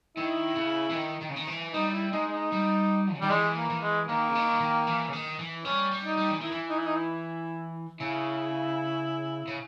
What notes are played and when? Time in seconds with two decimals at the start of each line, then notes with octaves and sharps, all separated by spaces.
0.17 D#3 E4
0.56 C#3
0.89 E3
0.95 D#3
1.21 D#3
1.29 C#3
1.36 D#3
1.47 E3
1.73 G3 D#4
1.93 E4
2.13 G#3 D#4
2.32 D#4
2.52 G3
3.14 C#3
3.21 D#3 G3
3.30 E3 G#3
3.56 A#3
3.70 E3
3.82 G#3
4.09 D#3 A#3
4.29 C#3
4.35 D#3
4.60 D#3
4.87 E3
5.09 C#3
5.13 D#3
5.39 E3
5.65 G3 C#4
5.91 G3
6.05 D#4
6.18 G3
6.30 E3
6.41 D#3 E4
6.52 E3
6.70 D#4
6.78 E4
6.86 D#4
6.96 E4
8.00 C#3 E4
9.48 C#3